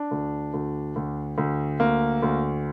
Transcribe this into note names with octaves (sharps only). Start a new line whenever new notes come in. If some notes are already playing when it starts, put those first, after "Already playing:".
Already playing: D4
D2
D2
D2
D2
D2 A#3
D2